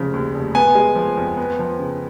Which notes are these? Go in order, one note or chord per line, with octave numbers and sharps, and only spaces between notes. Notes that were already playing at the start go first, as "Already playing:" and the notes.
Already playing: F1 C#3 F3
D#2
F1
B3 G#5
G#3
F3
F2
B3
F3
C#3